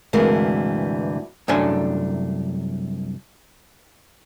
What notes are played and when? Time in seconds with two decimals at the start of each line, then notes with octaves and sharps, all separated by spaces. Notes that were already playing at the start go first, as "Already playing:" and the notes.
0.13 D2 G2 C3 E3 G#3 A#4
1.48 C2 F#2 A3 D4 G#5